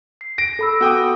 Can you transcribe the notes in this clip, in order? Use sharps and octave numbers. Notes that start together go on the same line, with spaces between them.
C7
A#6 D7
A4 B5 E6
B3 F#4 A4 G5 D6 D#6